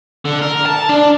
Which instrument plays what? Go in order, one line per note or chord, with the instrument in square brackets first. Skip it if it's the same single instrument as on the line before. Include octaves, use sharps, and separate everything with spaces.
[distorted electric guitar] D3
A#4
A5
D4